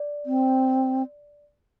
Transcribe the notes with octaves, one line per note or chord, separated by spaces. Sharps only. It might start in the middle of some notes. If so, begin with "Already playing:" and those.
Already playing: D5
C4